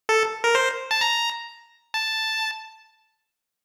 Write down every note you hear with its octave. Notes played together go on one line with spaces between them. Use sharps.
A4
A#4
C5
A5
A#5
A5